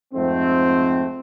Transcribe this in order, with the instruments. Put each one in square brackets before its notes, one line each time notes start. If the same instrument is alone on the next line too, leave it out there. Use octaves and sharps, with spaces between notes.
[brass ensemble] F2 G#2 A3 C4